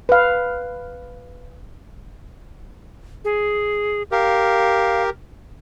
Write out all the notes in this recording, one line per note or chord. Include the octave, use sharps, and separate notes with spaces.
B4 F5
G#4
G4 A#4 F5